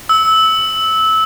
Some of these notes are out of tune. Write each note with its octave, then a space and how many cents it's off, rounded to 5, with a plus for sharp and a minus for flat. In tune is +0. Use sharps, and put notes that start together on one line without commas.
E6 -20